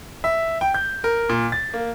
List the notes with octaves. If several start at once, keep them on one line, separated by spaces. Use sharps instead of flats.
E5
G5
G6
A#4
A#2
A6
A#3